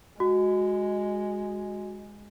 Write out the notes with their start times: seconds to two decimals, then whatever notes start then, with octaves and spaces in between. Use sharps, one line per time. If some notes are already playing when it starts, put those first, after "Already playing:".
0.20 G#3 F#4